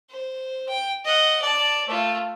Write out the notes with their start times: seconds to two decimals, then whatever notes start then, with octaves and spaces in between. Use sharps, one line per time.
0.11 C5
0.69 G5
1.05 D#5 F#5
1.42 D5 A5
1.87 A3 F4